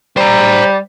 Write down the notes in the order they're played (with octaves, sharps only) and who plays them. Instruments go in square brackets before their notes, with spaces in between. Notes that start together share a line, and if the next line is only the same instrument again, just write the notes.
[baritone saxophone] G3 [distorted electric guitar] C5 A#5